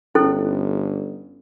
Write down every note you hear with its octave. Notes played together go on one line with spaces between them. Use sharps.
G1 C#4 E4 A4